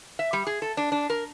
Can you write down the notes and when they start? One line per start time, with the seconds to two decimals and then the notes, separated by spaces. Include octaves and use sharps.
0.19 E5
0.33 G3
0.47 G#4
0.62 A4
0.77 D4
0.92 D4
1.10 A#4